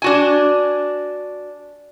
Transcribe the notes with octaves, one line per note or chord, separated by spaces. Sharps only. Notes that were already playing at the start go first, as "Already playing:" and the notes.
D4 F#4 G#5